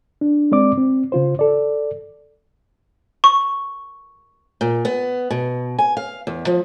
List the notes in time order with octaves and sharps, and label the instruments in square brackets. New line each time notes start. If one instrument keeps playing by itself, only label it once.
[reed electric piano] D4
G#3 C4 D5 D6
C4
C#3 F4 C5
A4 D5
[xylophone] C#6
[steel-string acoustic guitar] A#2
B3
B2
G#5
F5
E2
F3